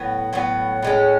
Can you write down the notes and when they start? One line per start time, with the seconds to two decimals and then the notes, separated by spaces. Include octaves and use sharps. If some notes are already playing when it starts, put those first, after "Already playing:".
Already playing: A2 F#3 B3
0.33 A2 F#3 B3
0.82 A2 G#3 C#4